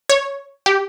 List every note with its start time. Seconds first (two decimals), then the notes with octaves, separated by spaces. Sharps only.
0.10 C#5
0.66 G4